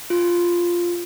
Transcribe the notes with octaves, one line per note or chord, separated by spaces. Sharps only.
F4